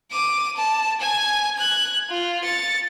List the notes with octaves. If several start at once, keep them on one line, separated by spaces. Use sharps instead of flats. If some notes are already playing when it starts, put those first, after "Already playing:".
D6 D#7
A5
G#5 G#6
F#6 G#6
F4
A6 C#7